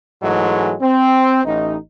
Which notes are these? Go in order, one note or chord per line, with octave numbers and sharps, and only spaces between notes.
G#2 E3 F#3 G#3 A3
C4
A1 D#4